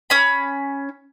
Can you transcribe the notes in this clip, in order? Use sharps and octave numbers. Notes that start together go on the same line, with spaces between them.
C#4 B5